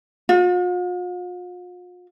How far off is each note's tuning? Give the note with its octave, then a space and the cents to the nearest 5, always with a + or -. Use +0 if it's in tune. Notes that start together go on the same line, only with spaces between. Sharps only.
F4 +45